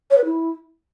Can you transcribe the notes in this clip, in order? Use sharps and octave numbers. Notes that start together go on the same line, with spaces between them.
C#5
B4
E4